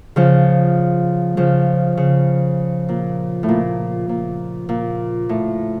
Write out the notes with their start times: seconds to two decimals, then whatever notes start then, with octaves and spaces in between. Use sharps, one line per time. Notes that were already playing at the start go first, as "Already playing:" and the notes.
0.16 C#3 F3
1.37 C#3 F3
1.97 C#3
2.89 A#2
3.43 A2
3.49 A#2
4.09 A#2
4.69 A#2
5.29 A2